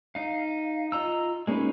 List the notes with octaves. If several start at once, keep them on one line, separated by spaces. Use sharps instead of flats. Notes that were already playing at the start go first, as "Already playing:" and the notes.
D#4 F5
F4 D#5 A#5 E6
G#3 A#3 C#4 D#4 B4